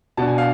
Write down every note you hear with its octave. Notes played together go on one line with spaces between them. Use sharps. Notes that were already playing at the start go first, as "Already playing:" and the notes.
B2 B3 D4 A5
G#5
F5